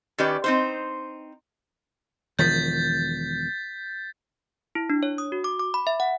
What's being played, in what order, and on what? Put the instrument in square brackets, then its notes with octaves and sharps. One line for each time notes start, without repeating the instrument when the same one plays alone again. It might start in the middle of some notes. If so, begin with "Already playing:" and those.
[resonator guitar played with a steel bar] D#3 C#4 G4 B4 D5
C4 D#4 C5
[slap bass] E1 D#3 F3 [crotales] G6 A6 B6
[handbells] E4
D4
C#5
D#6
F#4
D6
D6
B5
E5
F#5